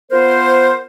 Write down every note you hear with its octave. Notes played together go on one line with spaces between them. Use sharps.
B3 F4 A#4 C5